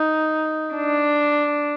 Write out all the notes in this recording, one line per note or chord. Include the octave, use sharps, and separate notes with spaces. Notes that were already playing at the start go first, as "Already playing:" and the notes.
Already playing: D#4
D4